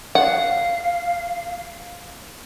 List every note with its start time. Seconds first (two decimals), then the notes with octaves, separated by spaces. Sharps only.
0.15 F5 F#5